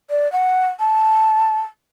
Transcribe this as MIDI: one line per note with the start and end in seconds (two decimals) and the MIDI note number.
0.10 0.31 74
0.32 0.68 78
0.80 1.59 81